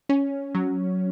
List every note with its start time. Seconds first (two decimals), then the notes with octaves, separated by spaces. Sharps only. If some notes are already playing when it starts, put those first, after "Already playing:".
0.09 C#4
0.55 F#3